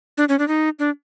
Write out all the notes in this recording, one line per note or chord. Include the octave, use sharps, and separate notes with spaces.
D4
C#4
D4
D#4
D4